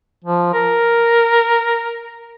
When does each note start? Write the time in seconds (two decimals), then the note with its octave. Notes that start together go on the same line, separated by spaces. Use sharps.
0.24 F3
0.54 A#4